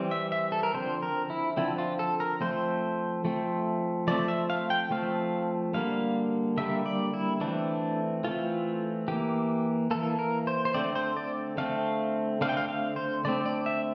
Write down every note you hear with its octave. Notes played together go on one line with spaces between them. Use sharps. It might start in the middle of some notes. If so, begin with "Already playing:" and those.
Already playing: E3 G3 C4
E5
E5
A4
A#4
D3 F3 C4 C5
A#4
E4
D3 F3 C4 E4
F4
A4
A#4
F3 A3 C4 C5
F3 A3 C4
F3 A3 C4 D5
E5
F5
G5
F3 A3 C4 F5
D3 G3 A#3 F5
D3 G3 A#3 E5
D5
E4
E3 A3 C4 D4
E3 A3 C4 F4
E3 A#3 G4
E3 A#3 A4
A#4
C5
C5
D3 A3 C4 D5
C5
D5
D3 A3 C4 F5
D3 A3 C4 F5
G5
F5
F5
C5
D3 A3 C4 D5
D5
E5